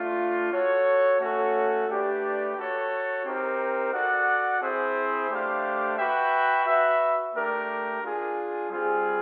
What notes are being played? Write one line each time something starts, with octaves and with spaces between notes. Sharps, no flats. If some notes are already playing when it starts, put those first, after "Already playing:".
Already playing: A3 D4 F4
F#4 A4 C#5
A3 C#4 F#4 A4 C#5
A3 D4 G4 B4 D5
F#4 A4 C#5
C4 D#4 G4 A#4
F#4 A4 D5 F#5
C4 E4 G#4 C5 E5
A3 D4 G4 C5 F5
F#4 B4 E5 G5
F#4 B4 E5
A3 D4 G4 A#4
D4 F4 G#4
G3 C4 F4 G#4